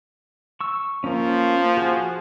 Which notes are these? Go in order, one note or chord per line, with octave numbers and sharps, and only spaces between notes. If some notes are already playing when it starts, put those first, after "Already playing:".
C#6 E6
F3 A#3 C#4
F#4 G#4